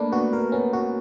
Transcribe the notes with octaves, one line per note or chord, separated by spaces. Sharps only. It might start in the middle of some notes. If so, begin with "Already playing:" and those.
Already playing: A3 A#3 D4 B4
B3 F#4
A#3 A#4
B3 C#4
B3 F#4